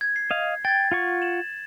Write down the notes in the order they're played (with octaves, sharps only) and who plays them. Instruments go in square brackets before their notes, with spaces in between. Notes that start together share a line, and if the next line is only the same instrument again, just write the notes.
[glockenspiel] G#6
C7
[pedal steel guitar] D#5 F5
[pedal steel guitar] G5 [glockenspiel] G#6 A6
[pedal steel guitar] F4 F#5 C#6
[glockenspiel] E7 F#7